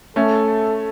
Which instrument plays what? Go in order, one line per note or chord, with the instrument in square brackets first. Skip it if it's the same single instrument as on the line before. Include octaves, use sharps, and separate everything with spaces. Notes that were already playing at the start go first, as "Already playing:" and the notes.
[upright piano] A3 C#4 [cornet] A4